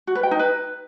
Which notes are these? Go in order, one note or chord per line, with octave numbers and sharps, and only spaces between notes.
F#4
B4
G5
D#4
B4